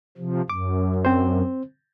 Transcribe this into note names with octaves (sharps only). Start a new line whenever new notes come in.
C3 F3
F#2 D6
C4 C5